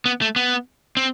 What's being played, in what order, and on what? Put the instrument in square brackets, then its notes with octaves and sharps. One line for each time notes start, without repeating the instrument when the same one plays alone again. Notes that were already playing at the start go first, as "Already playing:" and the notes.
[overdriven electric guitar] B3
A3
B3
C4